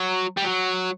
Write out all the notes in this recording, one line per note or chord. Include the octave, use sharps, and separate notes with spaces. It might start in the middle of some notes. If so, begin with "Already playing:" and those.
Already playing: F#3
G3
F#3